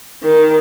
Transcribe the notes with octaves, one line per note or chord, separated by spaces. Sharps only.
D#3